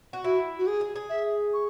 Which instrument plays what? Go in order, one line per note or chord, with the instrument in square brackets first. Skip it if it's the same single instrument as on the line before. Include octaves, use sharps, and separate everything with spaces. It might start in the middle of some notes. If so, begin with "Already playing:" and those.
[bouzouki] F#4
[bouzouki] E4 [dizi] F#4
[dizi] F#4
G#4
[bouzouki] G#4
G#4
[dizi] E5
C#6